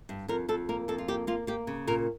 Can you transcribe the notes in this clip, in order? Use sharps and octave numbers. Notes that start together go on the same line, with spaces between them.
G2
F2 A#4
F2 A4
A#3 A#4
F2 A4
F4
A#3 G4
A#3 F4
A#3 G4
C#3
A#2 A#4